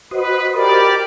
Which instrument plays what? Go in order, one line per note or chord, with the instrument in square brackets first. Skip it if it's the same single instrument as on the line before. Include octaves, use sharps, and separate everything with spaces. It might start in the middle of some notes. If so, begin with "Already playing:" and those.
[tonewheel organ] F#4 C5 D#5 [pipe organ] B4
[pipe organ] G4 D5 [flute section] A#4 [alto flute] B5